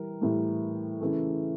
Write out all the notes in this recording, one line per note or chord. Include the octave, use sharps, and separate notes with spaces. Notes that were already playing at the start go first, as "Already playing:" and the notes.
Already playing: E3 G3 A#4
A2 E3 G3
C#3 E3 A3